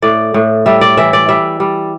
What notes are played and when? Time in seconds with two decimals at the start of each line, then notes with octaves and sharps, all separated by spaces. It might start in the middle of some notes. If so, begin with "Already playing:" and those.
0.02 A2 D5
0.34 A2
0.66 G3 E5
0.81 D5
0.97 E3 E5
1.13 D5
1.28 G3 E5
1.60 G3